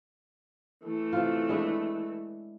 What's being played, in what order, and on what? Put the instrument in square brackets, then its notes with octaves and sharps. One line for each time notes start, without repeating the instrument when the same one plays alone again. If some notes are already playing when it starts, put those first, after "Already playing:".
[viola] E3 A3
[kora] C3 F4
G#3 D4 E4